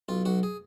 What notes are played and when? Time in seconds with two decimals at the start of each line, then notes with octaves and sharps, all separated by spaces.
0.09 B1 F4
0.25 B1 F#4
0.43 G#4